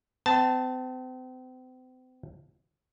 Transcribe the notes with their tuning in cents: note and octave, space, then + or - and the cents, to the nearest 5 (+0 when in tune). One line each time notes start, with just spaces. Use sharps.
C4 -40 A5 +0